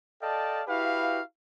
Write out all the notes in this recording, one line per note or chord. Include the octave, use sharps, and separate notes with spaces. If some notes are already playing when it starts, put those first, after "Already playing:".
A4 D5 D#5 F5 G5 A5
E4 F#4 G4 B4 F5